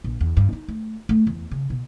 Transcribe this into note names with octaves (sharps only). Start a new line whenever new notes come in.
A#1
E2
G2
D#4
A3
A3
E2
C#3
B2